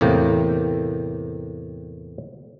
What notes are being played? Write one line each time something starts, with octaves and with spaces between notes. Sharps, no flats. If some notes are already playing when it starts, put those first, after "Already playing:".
E2 A2 C3 A#3 G5